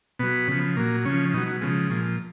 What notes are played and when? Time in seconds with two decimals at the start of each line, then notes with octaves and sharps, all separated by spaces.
0.19 B2 F#3 B3
0.48 C#3 F3
0.77 A#2 F#3 A#3
1.05 C#3 F3 C#4
1.34 B2 F#3 D#4
1.47 F#3
1.61 C#3 F3 G#3
1.90 A#2 F3